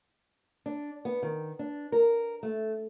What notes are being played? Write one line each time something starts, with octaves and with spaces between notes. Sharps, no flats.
D4
B3
D#3
D4
A#4
A3